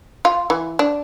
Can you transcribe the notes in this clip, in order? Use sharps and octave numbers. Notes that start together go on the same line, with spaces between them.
F4
E3
D4